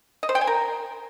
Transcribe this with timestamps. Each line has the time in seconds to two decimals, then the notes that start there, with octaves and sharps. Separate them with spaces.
0.23 D#5
0.29 C5
0.35 G5
0.41 G#5
0.47 A#4